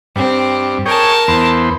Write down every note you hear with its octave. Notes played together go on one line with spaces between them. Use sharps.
G2 C4
G#4 A#4 C#5 G5 A5
E2 B3 C5